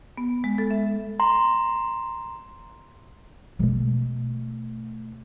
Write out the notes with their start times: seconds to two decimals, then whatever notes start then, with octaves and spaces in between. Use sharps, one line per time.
0.17 B3
0.44 G#3
0.58 A4
0.71 E5
1.20 A#5 C6
3.59 B2 A3